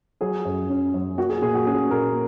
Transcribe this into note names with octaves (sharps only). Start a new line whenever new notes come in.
F#3 G#4
F#2
C#4
F#2
A#3 F#4
G#4
A#2 G#4
F#4
C#4 G#4
A#2 A#4